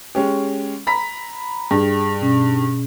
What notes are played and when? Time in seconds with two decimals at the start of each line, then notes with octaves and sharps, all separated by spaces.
0.15 G#3 C#4 G4
0.87 A#5 B5 B6
1.71 G2 G#4
2.21 B2 C#4